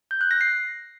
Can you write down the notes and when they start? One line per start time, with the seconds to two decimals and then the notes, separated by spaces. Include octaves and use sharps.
0.11 G6
0.21 F#6
0.31 A#6
0.41 C7